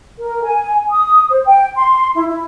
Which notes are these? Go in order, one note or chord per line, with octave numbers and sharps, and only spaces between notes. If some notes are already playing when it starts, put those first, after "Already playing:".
A#4
G#5
D#6
C5
G5
C6
E4
E4